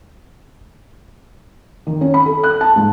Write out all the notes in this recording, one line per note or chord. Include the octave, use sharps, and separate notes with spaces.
D#3
C#4
B5
A4
F#6
A5
G#2